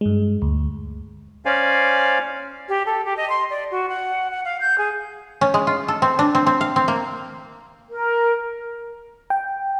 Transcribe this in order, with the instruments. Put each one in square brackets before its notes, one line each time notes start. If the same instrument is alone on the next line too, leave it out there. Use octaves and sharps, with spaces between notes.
[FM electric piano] G2 G#3
D2
[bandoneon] C#4 C5 D5 F5 G#5
[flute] G4
A4
G4
D#5
C6
D5
F#4
F#5
F#5
F5
G6
G#4
[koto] C#4
G#3
F4
A4
C4
D4
C4
C4
F5
C4
A#3
[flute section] A#4
[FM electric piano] G5